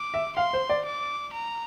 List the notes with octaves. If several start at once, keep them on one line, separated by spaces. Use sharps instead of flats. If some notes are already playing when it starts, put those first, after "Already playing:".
Already playing: D6
E5
F5 C6
C5
D5
D6
A#5